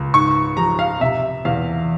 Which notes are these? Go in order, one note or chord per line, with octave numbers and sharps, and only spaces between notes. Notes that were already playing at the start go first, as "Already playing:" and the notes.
Already playing: C#2
G#2 C#6
F3 A#5
F5
C3 E5
E2 F5